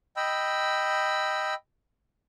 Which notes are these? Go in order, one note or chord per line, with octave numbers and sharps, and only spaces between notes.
D#5 G5 B5 E6